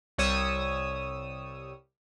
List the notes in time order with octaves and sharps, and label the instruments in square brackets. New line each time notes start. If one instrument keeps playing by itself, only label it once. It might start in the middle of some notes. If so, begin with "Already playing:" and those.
[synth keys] C2 G3 C#5 D#6 E6